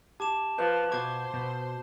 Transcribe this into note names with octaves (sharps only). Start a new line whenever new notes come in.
G4 A5 D6 E7
F3 B4 G6
B2 C5 D6 G#6
B2